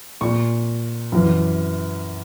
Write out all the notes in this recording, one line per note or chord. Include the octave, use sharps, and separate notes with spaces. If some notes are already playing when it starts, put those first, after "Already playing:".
A#2 C#6
F#2 E3